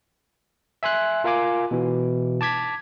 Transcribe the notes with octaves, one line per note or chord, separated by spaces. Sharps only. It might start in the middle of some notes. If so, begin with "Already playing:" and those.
E5 G#5 C6 F#6
F4 A#4 F5 G#5 D6
B2 E3
A5 D6 G#6 B6